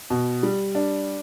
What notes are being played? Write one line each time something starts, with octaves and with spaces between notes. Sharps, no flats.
B2
G3
D4